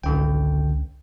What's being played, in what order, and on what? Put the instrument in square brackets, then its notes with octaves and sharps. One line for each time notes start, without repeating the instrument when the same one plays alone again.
[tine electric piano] G#1 D3 G5 [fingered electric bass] C#2